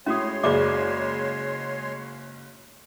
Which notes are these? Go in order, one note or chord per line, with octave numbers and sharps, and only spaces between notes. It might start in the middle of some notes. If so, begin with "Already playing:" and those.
A2 G#3 C#4 F#4 C#5 C6 D#6
F#1 C#3 F#4 G#4 D5 D#5 D6